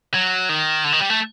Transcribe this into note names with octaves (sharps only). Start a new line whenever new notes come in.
F#3
D#3
D3
D#3
G3
A3